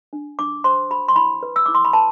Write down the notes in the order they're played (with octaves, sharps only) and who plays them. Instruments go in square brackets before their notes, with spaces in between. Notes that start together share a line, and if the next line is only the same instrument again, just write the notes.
[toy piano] D4
D4 D6
C5 C6
F#4 B5
C6
E4 B5
B4
E6
E4 D6
C6
B5
B4 A5